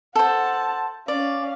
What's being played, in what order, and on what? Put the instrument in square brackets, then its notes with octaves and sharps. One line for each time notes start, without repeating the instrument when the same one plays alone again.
[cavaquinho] A4 C5 [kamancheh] F#5 A5
[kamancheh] C#4 F5 [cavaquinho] D5